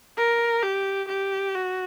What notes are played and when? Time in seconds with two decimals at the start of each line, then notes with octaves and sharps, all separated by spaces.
0.17 A#4
0.63 G4
1.08 G4
1.55 F#4